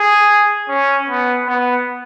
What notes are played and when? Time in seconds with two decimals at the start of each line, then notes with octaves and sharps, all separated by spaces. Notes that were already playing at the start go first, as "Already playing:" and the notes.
Already playing: G#4
0.69 C#4
1.08 B3
1.47 B3